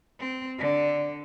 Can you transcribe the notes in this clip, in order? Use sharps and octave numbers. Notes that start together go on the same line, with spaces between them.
C4
D3